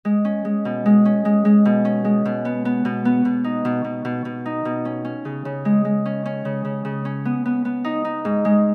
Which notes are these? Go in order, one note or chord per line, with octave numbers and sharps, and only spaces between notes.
G#3
C#4
G#3
B2
G#3
C#4
G#3
G#3
B2
C#4
G#3
B2
B3
B3
B2
B3
B2
D#4
B2
B2
B2
B2
D#4
B2
C#4
C#4
C#3
C#3
G#3
G#3
C#4
C#4
C#3
C#3
C#3
C#4
B3
B3
B3
D#4
D#4
G#2
G#3